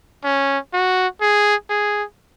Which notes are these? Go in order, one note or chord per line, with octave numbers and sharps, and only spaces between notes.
C#4
F#4
G#4
G#4